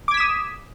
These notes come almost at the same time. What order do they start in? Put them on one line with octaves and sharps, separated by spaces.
D6 G#6 B6 E7 D#6